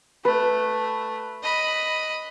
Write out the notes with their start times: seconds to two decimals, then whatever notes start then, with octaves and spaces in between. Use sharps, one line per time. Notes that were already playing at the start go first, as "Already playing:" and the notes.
0.25 A3 B4
1.43 D#5 B5